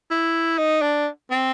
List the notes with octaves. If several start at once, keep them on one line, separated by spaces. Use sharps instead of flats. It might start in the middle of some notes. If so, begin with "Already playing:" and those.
E4
D#4
D4
C4